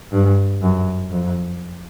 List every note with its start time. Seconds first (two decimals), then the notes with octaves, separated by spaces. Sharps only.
0.12 G2
0.62 F#2
1.11 F2